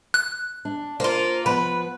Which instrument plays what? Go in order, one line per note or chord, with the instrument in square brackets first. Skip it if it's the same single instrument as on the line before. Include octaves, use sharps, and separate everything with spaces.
[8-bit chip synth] F#6
[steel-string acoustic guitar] D4
[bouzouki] A#3 F4 [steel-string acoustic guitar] C5
[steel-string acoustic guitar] F3 B3 [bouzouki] B4